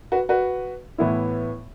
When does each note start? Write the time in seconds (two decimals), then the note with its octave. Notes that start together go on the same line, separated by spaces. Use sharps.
0.12 F#4 B4
0.29 F#4 B4
0.98 A2 E3 B3 E4